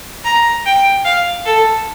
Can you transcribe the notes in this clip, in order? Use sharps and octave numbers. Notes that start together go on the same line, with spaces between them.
A#5
G5
F5
A4